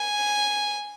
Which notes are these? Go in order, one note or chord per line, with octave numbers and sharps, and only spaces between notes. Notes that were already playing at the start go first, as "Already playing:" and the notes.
Already playing: G#5